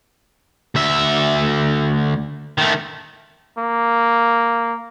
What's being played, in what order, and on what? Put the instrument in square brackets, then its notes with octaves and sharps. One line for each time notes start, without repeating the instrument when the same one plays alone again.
[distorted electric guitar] D2 E5
D#3 A3
[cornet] A#3